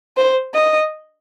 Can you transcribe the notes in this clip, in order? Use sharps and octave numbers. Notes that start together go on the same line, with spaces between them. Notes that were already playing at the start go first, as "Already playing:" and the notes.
C5
D#5